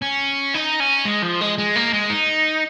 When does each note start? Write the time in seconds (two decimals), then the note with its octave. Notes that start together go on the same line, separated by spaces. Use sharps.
0.02 C#4
0.54 D#4
0.80 C#4
1.06 G#3
1.23 F3
1.41 G#3
1.58 G#3
1.76 A#3
1.93 G#3
2.10 D#4